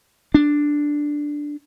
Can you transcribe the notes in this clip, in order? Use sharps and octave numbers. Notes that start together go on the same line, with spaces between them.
D4